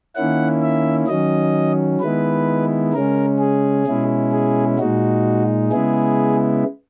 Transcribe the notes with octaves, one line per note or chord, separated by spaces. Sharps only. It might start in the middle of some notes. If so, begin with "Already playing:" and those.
D#3 A#3 C#4 E4 F#5
E5
D#3 F#3 C#4 D#5
D#3 G#3 B3 E4 B4
C#3 G#3 C#4 A#4
G#4
B2 G#3 C#4 E4
G#4
A#2 G#3 D#4 F#4
C#3 G#3 B3 E4 G#4